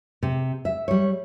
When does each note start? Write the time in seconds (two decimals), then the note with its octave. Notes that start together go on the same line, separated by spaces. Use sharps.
0.23 C3
0.65 E5
0.88 G3 C#5